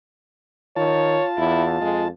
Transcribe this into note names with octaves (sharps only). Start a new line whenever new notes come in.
D#3 F4 C#5 A5
E2 E4
F2 G#3